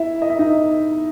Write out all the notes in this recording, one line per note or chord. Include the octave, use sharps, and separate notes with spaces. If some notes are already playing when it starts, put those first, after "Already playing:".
Already playing: E4 E5
D#5
E5
D#4 D#5